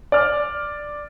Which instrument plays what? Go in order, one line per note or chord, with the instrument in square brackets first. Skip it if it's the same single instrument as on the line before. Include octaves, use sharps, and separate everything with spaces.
[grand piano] D5 F6